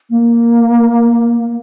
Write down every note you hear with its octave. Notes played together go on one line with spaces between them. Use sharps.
A#3